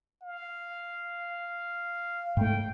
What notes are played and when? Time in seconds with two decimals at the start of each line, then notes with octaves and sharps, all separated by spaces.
0.23 F5
2.37 G#2 A3 G5